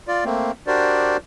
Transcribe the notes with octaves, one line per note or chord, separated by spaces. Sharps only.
F4 D5
A3 A#3 C4
D4 F#4 G4 A#4 C5 D5